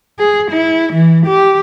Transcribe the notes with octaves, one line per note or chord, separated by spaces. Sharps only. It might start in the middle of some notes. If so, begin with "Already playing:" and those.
G#4
E4
E3
G4